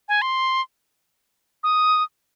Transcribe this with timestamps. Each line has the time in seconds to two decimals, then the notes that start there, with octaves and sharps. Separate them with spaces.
0.09 G#5
0.22 C6
1.63 D#6